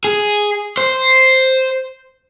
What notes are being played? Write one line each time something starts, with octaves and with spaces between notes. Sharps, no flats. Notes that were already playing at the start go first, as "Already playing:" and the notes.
G#4
C5